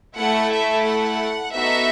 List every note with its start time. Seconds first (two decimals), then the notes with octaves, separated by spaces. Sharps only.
0.17 A3 E4 A4 F#5
0.51 E5
0.84 F#5
1.52 B3 D#4 F#4 A4 E5